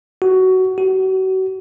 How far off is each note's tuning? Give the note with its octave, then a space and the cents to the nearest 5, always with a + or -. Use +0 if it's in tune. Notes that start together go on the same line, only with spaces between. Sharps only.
F#4 +15
F#4 +35